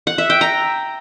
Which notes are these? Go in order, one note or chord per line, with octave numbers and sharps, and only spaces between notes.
F#5
E5
G5
A#5